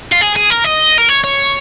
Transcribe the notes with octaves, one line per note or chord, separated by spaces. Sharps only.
F4
G#4
G#4
A#4
D#5
A#4
C#5
C#5